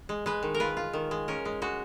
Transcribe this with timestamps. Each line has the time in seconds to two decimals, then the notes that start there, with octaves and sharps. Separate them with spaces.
0.09 G#3
0.26 G#3 B4
0.43 D#3
0.54 A#4
0.60 F4 B4
0.77 F4
0.93 D#3
1.11 G#3
1.28 C#4 A#4
1.45 G#3
1.62 G#3 F#4